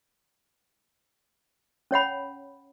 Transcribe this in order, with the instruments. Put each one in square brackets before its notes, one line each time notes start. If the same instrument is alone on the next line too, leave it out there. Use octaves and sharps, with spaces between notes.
[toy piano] C#4 C#5 F#5 B5